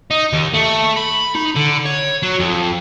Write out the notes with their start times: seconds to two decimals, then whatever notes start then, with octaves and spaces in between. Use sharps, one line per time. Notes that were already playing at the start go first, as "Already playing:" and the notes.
0.11 D#4
0.33 D#2
0.54 A3
0.96 B5
1.35 D#4
1.56 D3
1.85 C#5
2.23 F#3
2.39 F2